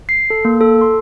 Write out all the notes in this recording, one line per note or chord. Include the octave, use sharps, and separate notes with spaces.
C7
A4
A#3
A4
C6